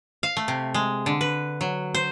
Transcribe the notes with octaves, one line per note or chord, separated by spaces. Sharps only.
F5
A3
C3
G#3
D3
B4
F#3
C5